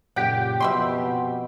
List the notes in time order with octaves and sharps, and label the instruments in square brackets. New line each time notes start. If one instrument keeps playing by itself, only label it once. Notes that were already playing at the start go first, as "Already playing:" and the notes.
[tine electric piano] F#2 A#2 C#3 [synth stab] G4 G5 D6 [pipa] F#5
[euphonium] B2 [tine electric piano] F3 C4 [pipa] E5 B5 C6